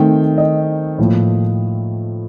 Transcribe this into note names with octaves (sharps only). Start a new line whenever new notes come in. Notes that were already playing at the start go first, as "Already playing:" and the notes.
Already playing: D#3 A3 C4 G5
D#5
A2 F3 A#3